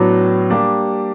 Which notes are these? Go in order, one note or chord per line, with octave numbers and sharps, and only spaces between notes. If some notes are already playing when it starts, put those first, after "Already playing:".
Already playing: A2 F#3 B3 D4 F#4
G3 A#3 D4 G4